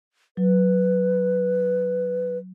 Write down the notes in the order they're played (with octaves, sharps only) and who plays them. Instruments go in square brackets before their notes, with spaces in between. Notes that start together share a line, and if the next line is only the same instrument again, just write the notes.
[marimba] F#3 [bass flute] B4